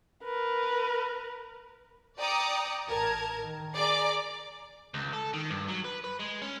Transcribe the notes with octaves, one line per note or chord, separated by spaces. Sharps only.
A#4 B4
D5 G5 A#5 D6 D#6 C#7
A1 A#4 A5 G#6
D#3
G#4 D5 A#5 D6
C#2
A4
D#3
G2
F#3
B4
B4
G#3
C#4